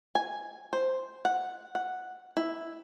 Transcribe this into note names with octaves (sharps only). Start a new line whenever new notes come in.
G#5
C5
F#5
F#5
E4